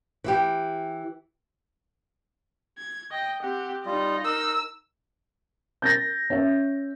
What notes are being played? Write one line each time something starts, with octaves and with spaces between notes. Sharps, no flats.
E3 E4 G4
G#6
D#5 G5
C4 G4 F#5
G3 D#4 F4 D#5
A#4 E6
G6 A6 A#6
C#4 E5